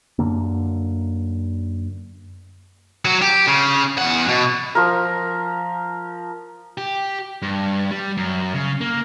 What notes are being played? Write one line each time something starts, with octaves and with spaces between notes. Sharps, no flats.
F#2 D3 A#3
F#3 F#4
G4
C#3
E2 F#5
B2
F3 A#4
G4
G2
G3
F#2
C#3
A#3